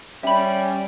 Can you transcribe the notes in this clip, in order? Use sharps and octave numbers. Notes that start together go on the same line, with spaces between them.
G3 C#4 E5 B5